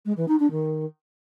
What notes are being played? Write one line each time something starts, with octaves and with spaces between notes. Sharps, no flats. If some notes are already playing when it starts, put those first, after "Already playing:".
G#3
E3
D#4
D4
D#3